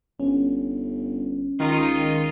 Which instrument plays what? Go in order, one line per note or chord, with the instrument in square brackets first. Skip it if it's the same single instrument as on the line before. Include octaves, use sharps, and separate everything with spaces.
[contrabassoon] G1 [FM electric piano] C#4
[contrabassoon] C#2 [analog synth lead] D#3 [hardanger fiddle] D#4 F4